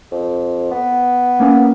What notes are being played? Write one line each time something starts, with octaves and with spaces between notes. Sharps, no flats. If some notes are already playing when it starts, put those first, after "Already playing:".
F2
B3
A#3 C#4